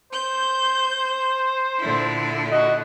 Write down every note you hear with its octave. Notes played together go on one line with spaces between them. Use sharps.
C5 G6
A#2 D3 E4
F#4 D#5